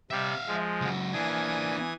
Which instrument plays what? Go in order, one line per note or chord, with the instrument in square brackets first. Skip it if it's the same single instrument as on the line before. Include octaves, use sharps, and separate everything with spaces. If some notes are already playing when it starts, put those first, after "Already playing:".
[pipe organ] C3 G3 [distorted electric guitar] E5 F5
[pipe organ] F3 G#3
[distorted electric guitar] C#2 F#3
[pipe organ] E3 G#5 D#6 [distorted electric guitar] A#3 D4